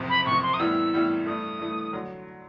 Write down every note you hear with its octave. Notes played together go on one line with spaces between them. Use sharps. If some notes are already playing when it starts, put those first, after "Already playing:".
Already playing: F#1 F2 C3
B5
F#1 F2 C3 C#6
C6
D#6
A2 E3 G3 B3 E6
A2 E3 G3 B3
G2 E3 A3 D#6
G2 E3 A3
D3 F#3